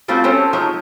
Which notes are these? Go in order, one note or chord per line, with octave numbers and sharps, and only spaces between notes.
G3 A3 C4 F4 F#4
C4 C#4 A4 C5
F3 F#3 G#3 D#4